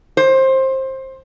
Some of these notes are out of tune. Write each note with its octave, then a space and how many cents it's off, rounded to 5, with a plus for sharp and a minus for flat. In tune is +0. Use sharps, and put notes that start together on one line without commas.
C5 +20